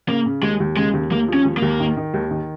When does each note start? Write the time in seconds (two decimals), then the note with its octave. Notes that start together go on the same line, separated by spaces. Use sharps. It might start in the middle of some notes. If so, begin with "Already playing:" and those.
0.09 C#3 A#3
0.26 C#3
0.43 D#2 G#3
0.60 D#2
0.77 C#3 G#3
0.94 D#2
1.11 D#2 A#3
1.28 F3
1.34 C#4
1.45 D#2
1.57 D#2 A#3
1.80 D#3
1.97 D#3
2.14 D#2
2.30 D#3